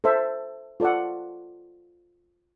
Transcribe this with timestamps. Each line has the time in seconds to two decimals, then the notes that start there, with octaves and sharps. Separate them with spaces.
0.04 A4 C5 E5
0.80 F4 A4 D5 F#5